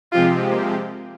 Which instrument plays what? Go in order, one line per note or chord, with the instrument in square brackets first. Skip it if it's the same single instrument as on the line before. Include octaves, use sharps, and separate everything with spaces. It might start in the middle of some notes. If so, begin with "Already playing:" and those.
[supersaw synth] C3 F3 G#3 C4 G4 [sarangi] F4
[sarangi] A#3